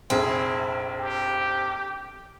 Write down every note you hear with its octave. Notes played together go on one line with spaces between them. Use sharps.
F1 A#1 C4 E4 G#4
G4